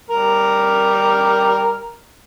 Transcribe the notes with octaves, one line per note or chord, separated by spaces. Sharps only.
G3 A#4 F6